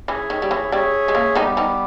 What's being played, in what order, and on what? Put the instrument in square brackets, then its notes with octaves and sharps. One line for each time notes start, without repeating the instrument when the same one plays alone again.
[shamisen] E3 [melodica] C#4 G#4 C#5 E5
[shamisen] D#3
G3
E3
[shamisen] G3 [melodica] C#4 G#4 C#5 E5
[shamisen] G#3
A#3
[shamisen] D#3 D#4 [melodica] G3 B3 G4
[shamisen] D#3 D#4